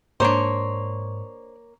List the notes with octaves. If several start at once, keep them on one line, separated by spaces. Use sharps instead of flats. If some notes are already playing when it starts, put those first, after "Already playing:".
G#2 A#3 D4 C5 C#5